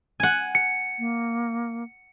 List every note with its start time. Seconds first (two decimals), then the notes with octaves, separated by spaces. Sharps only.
0.20 F#5 G#5
0.55 C#7
0.99 A#3